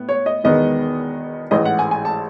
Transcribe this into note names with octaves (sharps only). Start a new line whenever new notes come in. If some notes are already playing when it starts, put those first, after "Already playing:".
Already playing: A2 B3
C#5
D#5
E1 E2 D#3 G#3 B3 D#5
A1 G#2 E3 D#5
F#5
G#5
G#5
A5